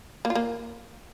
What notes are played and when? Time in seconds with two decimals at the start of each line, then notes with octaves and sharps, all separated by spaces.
0.25 A#3
0.30 F4
0.35 A#3